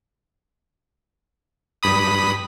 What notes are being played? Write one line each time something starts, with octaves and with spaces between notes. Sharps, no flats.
G2 B5 D#6